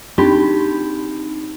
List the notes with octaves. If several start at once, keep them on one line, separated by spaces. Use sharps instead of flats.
C4 D4 D#4 G4